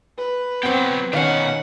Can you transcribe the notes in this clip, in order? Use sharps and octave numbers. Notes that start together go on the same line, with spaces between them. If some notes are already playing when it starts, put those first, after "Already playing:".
B4
F#3 B3 C4 G4
B2 D#3 C#4 F5 F#5